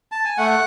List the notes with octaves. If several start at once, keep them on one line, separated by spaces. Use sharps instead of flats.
A5
G#5
A3 F#5